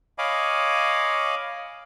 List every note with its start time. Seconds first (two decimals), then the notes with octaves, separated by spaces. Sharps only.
0.18 C#5 D#5 F5 G#5 B5 D6